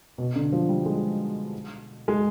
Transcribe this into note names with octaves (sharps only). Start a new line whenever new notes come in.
B2
D3
F3
G3
G#3
G#3